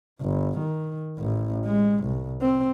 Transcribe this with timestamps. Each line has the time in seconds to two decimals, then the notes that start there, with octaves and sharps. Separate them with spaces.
0.22 G1
0.60 D#3
1.19 A1
1.65 G#3
2.05 C2
2.42 C4